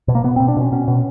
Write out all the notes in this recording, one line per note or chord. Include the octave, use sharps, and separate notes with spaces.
B2
A#3
B2 B3
C4
B2
D4
B2 C#4
B2 C#4
B2